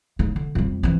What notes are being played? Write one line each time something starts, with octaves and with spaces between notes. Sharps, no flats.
C#3 D#4
D3
F2 G3
E3 C4